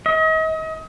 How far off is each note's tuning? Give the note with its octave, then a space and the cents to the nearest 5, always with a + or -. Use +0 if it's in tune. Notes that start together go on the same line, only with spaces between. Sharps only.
D#5 +35